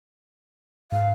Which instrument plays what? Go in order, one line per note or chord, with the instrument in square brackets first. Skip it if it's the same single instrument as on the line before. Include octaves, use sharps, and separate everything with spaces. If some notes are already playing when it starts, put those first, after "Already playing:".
[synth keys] G#2 [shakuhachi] F5